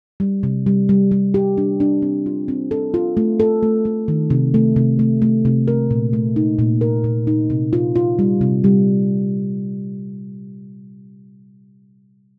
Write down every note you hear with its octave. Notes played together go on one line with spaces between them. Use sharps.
G3
C3
G3
G3
G3
G4
D4
D4
C4
F4
C4
A4
F4
A3
A4
A3
A3
D#3
C3
A3
C3
A3
A3
C3
A#4
A#2
A3
D#4
A#2
A#4
A#2
D#4
C3
F4
F4
G3
C3
G3